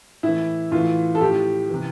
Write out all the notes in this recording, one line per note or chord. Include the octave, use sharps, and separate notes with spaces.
A2 E3 E4
A2 E3 F4
A4
A2 F3 G4
C3 E3